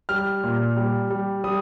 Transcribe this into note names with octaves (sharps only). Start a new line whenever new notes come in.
G3 F6
A#2
G3
G3
G3 D#6